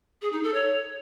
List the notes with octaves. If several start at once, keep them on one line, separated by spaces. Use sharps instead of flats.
G#4
D#4
A4
C#5